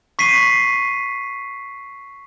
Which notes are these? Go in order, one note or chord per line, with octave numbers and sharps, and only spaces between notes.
C#6 B6 C7 D#7